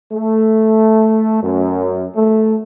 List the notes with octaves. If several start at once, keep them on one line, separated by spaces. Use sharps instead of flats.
A3
F#2
A3